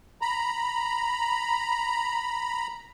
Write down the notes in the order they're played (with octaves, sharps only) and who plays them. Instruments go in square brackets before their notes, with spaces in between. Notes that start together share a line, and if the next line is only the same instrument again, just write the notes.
[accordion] A#5 B5